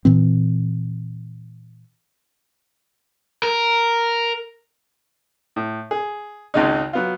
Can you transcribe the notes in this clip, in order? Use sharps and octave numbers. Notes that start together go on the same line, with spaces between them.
A#2 E3 C4
A#4
A2
G#4
G#1 C#2 C#3 D#4
F#3 B3 F4